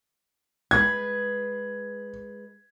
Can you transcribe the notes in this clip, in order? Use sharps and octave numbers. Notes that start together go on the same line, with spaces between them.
G#3 B4 G#6